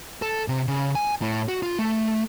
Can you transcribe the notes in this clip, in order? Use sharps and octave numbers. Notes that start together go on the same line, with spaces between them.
A4
C3
C#3
G#5
A2
F#4
F4
A3